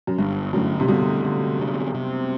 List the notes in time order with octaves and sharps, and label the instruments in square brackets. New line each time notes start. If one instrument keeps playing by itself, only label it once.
[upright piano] F#2
[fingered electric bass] G1 [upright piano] G2
[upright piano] F#2 A2 [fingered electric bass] D3
[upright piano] C3
[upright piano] G2 B2 [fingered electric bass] D3
[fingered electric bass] D3
C3
C3